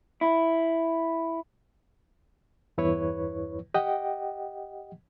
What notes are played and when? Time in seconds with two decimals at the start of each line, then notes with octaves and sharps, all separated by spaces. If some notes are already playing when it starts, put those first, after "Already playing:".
0.21 E4
2.78 E2 G2 E4 B4 C#5 C#6
3.74 G4 D#5 F#5 G5